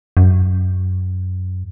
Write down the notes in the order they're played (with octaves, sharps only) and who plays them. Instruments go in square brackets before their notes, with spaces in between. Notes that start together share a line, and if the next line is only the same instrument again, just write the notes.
[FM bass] F#2